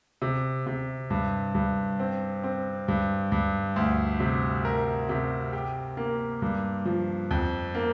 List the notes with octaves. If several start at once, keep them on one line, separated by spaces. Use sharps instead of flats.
C3
C3
G2
G2
C4
C4
G2
G2
D2
C3
A#4
C3
G4
A#3
G2
F3
F2
A#3